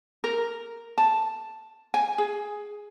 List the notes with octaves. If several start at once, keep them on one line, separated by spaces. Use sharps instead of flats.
A#4
A5
G#5
G#4